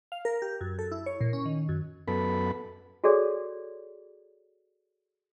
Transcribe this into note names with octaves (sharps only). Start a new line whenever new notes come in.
F5
A#4
G4
F#2
A4
E4
C#5
A#2
C#4
D#3
F#2
F#2 B3 A4 B5
F#4 G#4 A4 C#5 D5